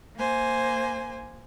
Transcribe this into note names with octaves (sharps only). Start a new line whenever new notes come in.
A#3 C5 G#5